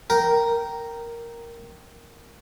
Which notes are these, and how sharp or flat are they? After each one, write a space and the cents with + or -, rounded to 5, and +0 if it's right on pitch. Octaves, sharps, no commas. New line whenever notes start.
A#4 +0 G5 -10